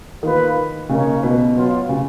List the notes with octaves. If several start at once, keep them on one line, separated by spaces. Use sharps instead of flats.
D#3 A#3 F4 B4
C#3 A#3 D#4 A#4 C#5
B2
F#3 B3 F4
C#3